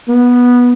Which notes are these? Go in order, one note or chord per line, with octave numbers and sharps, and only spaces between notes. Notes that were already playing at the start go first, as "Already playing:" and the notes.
B3